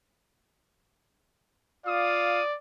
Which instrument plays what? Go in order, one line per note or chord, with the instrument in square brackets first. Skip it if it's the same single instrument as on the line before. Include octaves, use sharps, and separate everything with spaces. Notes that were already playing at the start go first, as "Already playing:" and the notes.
[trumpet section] F4 F5 D#6 [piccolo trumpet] D5